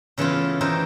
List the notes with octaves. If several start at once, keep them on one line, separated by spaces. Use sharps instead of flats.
C#3 E3 A3 B3 F4
D#3 E3 D#4 A#4 C5